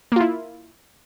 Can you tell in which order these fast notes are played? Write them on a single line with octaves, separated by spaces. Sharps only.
A#3 F4 E4